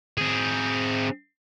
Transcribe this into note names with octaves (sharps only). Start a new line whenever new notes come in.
C4 G#4